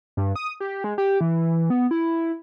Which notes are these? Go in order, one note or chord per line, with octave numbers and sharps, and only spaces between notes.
G2
D#6
G4
G#3
G4
E3
B3
E4